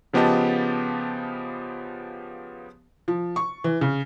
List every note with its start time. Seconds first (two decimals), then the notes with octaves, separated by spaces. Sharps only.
0.13 C#3 F3 B3 G4 D#5 A5
3.08 F3
3.36 C#6
3.64 E3
3.81 C#3